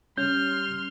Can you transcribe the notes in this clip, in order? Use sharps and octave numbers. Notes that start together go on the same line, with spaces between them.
G3 C#4 C6 F6 G6